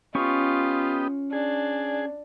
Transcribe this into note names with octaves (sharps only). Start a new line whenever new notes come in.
B3 C#4 F4 G4 D#5 C#6
D4 G#4